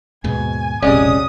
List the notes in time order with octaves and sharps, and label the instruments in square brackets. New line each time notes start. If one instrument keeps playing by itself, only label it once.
[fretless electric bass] D#2 G#2 B2 [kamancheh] G#5
[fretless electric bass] E1 A#1 [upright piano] C3 D5 [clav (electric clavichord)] G#3 C#4 [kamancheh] D#6